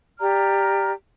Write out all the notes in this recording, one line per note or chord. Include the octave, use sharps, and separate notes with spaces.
G4 D5 A#5 F6